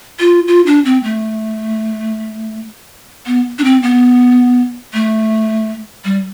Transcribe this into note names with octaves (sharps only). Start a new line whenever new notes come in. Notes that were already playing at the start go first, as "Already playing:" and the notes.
F4
F4
D4
C4
A3
B3
D4
C4
B3
A3
G3